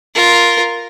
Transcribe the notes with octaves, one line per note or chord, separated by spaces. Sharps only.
F4 A#4